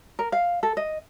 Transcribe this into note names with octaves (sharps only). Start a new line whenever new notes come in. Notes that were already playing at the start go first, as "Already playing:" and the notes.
A#4
F5
A4
D#5